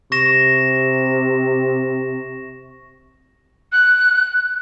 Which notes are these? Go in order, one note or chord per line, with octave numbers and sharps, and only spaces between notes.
C3 C#6 A#6 E7
F#6